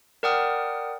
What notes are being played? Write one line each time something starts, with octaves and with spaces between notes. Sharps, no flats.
A#4 D5 F#5 G5 D#6 F6